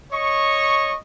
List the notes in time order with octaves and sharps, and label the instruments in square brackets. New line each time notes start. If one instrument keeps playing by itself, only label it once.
[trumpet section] C#5 D#5 C#6